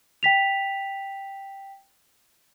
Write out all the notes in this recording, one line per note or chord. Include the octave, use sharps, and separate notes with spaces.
G5 B6 F7